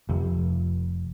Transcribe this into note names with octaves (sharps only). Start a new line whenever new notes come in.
F1